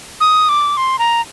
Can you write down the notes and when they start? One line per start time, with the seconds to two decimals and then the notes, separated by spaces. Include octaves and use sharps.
0.21 D#6
0.49 D6
0.77 C6
0.99 A#5